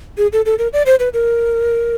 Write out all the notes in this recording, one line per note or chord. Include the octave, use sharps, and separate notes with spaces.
G#4
A4
A4
A#4
D5
C5
B4
A#4